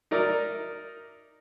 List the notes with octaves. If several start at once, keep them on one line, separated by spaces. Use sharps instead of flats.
D#4 A#4 D5 E5